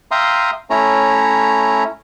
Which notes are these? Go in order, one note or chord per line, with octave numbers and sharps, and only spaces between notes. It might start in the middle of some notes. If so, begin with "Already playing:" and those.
E5 F5 G5 A#5 C6 D#6
A3 C#4 E4 C#5 A#5